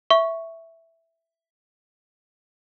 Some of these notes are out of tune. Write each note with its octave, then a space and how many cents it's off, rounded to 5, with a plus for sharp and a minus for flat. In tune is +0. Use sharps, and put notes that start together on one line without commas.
E5 +0 C#6 +0